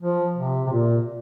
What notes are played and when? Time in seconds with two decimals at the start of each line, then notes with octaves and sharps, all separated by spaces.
0.01 F3
0.36 C3
0.66 C3
0.72 A#2